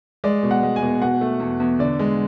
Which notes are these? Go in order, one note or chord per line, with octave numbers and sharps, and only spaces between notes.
G#3 D5
B2
F#5
G#3
G#5
B2
B2 F#5
A3
E2
E2
D3 D5
G#3